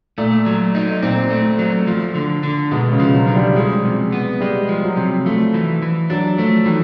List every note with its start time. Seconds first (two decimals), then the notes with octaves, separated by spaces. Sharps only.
0.18 A#2 A3
0.46 F#3
0.75 D#4
1.03 A#2 C4
1.30 A3
1.59 F#3
1.87 F3
2.15 D3
2.43 D3
2.71 B2 G#3
2.92 C#3
3.00 F3
3.14 F#3
3.28 D3
3.35 G3
3.56 F3 G#3
3.85 C3
4.12 B3
4.40 G3 G#3
4.69 F3
4.83 F#3
4.97 C3
5.26 F3 A3
5.54 E3
5.82 E3
6.10 F#3 D4
6.38 F3 A3
6.66 D#3 E3